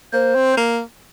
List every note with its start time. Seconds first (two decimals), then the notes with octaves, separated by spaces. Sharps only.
0.13 A#3 C5
0.35 C4
0.57 A#3